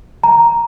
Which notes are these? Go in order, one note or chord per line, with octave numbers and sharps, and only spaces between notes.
A#5